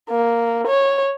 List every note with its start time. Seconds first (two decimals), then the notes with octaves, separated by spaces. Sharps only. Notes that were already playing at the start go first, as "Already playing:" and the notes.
0.10 A#3
0.67 C#5